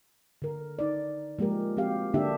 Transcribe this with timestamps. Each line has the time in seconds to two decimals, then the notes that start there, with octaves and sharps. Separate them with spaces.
0.42 D3 A#4
0.79 D#4 D5
1.39 F3 G#3 A#3 G4 A#4
1.77 F3 C4 F#4 G4 F5
2.14 D3 A#3 D4 G4 E5